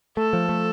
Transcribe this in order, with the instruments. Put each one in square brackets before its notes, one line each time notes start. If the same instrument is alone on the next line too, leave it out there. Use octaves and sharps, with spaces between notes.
[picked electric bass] A3 [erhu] A4
[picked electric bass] F3
A3